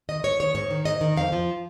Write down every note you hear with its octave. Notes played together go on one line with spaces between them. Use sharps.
D#3 D#5
G#2 C#5
D#3 C#5
G#2 C#5
D#3
G#2 D#5
D#3
F2 F5
F3